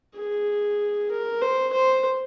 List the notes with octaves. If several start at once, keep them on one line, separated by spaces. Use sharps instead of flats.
G#4
A#4
C5
C5